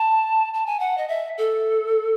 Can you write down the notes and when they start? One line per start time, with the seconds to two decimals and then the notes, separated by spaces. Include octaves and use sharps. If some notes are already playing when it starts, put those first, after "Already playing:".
Already playing: A5
0.54 A5
0.66 G#5
0.80 F#5
0.98 D#5
1.08 E5
1.38 A4